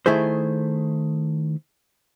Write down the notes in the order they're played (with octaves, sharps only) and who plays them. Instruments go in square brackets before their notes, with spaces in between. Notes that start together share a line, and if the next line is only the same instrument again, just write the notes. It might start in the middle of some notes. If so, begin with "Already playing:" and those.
[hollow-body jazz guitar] D#3 A3 E4 G#4 C5